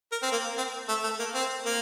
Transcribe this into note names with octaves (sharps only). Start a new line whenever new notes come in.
A#4
C4
A#3
C4
A3
A3
A#3
C4
A#3